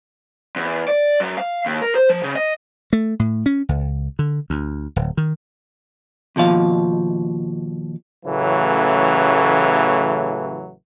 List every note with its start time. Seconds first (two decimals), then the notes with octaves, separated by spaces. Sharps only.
0.56 E2
0.88 D5
1.20 F#2
1.38 F5
1.66 D#2
1.82 A#4
1.95 C5
2.10 F3
2.23 C#3
2.35 D#5
2.93 A3
3.19 A2
3.46 C#4
3.69 C#2
4.19 D3
4.50 D2
4.96 D1
5.17 D#3
6.36 D#2 B2 F3 F5
8.26 A1 C#3 E3 F#3 A3